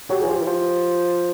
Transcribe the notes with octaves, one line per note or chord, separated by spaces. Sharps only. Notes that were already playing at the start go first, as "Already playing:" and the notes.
F#3 G4
E3 G#4
F3 G4
E3
F3